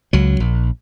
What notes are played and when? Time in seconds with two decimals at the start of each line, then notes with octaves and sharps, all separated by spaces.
0.13 C#2 F#3
0.40 A#1